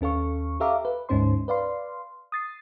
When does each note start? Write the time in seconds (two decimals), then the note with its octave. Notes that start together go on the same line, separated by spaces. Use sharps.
0.01 D#2 C#4 A4 F5 C#6
0.60 G4 A4 E5 F5 A#5 D6
0.85 B4
1.09 D2 G#2 C#4 D#4 C5 C6
1.48 B4 D5 F5 C6
2.32 D#6 A6 C7